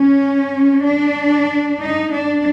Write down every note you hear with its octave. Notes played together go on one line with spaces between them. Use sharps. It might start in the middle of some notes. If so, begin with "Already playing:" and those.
Already playing: C#4
D4
D#4
D4